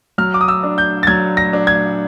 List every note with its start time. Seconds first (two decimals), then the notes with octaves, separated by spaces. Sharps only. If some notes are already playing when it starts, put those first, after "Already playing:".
0.18 F#3 F6
0.34 D6
0.41 D#6
0.48 E6
0.63 D4
0.78 G6
1.03 A6
1.07 F#3 G#6
1.37 A#6
1.53 D4
1.67 G#6